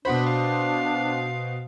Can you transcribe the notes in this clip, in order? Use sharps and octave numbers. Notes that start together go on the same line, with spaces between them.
B2 D4 F#4 C5 B5
F5